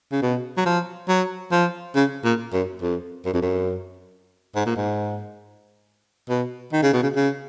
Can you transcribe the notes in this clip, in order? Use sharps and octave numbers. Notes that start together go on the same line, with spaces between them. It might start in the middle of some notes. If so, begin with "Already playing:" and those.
C#3
B2
F#3
F3
F#3
F3
C#3
A#2
F#2
F2
F#2
F2
F#2
G#2
A#2
G#2
B2
D#3
C#3
B2
C#3
C#3